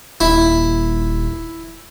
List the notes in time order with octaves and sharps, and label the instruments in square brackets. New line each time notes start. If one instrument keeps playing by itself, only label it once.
[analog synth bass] D#1 [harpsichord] E4